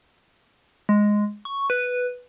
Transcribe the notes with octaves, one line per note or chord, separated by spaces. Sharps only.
G#3
C#6
B4